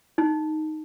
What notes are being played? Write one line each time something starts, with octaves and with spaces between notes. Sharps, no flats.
D#4